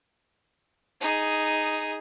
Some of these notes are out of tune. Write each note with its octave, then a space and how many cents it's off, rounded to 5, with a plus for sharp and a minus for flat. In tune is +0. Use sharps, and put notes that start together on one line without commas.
D#4 +0 G#4 +0